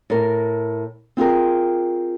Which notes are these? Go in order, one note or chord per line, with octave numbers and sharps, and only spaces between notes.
A2 A#4
C4 F4 G#4 A#4